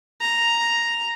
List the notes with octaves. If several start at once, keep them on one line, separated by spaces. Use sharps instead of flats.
A#5